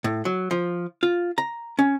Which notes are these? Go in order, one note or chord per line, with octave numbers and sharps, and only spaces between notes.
A2
F#3
F3
F4
A#5
C#4